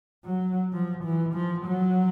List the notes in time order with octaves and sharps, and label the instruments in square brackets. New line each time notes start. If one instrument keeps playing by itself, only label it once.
[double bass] F#3
F3
E3
F3
F#3